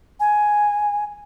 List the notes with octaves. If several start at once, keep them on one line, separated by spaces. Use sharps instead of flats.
G#5